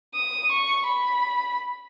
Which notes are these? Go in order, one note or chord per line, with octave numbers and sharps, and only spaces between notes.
D#6
C#6
B5